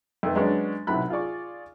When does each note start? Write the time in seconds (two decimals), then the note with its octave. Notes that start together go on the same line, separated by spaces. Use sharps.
0.23 F2 D#3 A3 B3
0.35 F#3 G#3 B3 C#4 D4
0.87 B1 A2 C3 F#3 B5 F#6
1.10 F4 G#4 D5 C#6